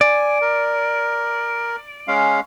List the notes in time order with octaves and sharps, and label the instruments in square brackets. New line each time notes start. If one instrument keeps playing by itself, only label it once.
[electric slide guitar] D5 [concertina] G#5
[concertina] A#4
G#3 C#4 F5